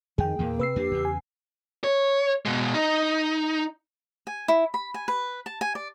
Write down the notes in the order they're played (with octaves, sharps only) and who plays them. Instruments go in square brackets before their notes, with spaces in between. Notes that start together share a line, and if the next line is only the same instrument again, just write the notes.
[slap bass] F2 [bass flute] D#3 [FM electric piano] G#4 G5
[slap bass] E2 A#2 E3 [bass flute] A#3
[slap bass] C3 [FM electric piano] B4 E6 C7
[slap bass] F2 A#3 D4 [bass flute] G4
[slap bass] E2 C#3
[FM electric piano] G#5
[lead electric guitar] C#5
B2 G#3
D#4
[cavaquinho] G#5
E4
B5
G#5
B4
A5
G#5
D5